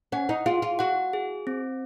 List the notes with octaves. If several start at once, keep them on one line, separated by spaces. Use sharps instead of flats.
C#4 F#5
D#4
F4 G#4
F4
F#4 F#5
G#4
C4